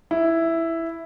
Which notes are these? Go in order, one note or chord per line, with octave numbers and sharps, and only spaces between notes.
E4